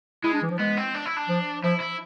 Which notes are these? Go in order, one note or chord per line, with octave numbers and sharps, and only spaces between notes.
G#3 E4
D4
E3
F3
G#3 B3
C4
D4
E4
D4
F3
F3 E4
E4